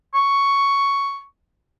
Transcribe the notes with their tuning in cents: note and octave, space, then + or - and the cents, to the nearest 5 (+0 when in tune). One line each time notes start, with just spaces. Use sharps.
C#6 +5